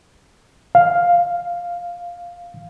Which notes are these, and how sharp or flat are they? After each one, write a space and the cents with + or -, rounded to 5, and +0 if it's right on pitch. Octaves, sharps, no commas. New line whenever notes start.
F5 +5